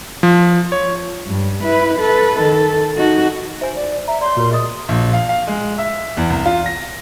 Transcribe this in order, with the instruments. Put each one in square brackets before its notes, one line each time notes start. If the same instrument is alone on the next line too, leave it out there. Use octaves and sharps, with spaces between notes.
[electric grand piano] F3
C#5
[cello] G2 G3
E4 B4
A4 B4
D#3 A4
D#4 F#4
[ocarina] C5 [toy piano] E5 G#5
[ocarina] D5
[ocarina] E5 [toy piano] A#5
[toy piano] C#5 D5 [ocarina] C6
[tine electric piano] A#2 A#4 [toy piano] F#4 B4 C#5
[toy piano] G#4 D#5 D#6
[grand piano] A#1
F5
F5
G#3
E5
E2
C2
F4
A#6